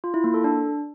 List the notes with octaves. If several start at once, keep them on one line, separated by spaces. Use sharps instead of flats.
F4
E4
A#3
A4
D4